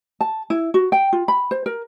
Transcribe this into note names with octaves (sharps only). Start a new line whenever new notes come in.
A5
E4
F#4
G5
F4
B5
C5
A#4